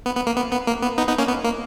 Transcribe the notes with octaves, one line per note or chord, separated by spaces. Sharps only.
B3
B3
A#3
B3
B3
A#3
B3
B3 D#4
B3 D#4
A#3 C#4
B3
A#3